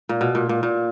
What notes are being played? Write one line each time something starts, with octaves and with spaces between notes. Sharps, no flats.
A#2
B2
A#2
A#2
A#2